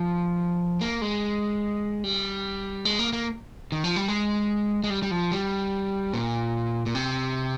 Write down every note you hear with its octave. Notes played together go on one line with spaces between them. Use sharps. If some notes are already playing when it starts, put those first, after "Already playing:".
Already playing: F3
A#3
G#3
G3
G#3
A#3
A#3
D#3
F3
G3
G#3
G#3
G3
G3
F3
G3
A#2
A#2
C3